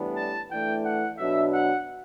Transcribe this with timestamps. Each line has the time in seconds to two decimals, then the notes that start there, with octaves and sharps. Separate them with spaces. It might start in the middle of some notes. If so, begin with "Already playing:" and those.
Already playing: A2 E3 G3 B3 D4
0.15 A5
0.50 E3 A3 D4 G5
0.83 F#5
1.18 B2 F#3 B3 D4 E5
1.52 F#5